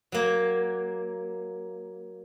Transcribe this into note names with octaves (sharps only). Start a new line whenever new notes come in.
F#3 A#3